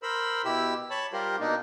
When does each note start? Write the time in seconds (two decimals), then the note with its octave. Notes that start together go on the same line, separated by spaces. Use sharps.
0.03 A#4 C5 B5 E6
0.45 B2 E4 G4 E6
0.91 C#5 A5 B5
1.13 G3 F4 G4 A#4 C5
1.40 B2 A#3 D4 D#4